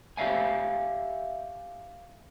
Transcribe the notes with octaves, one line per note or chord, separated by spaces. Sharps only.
G4 C#5 E5 F5 G#5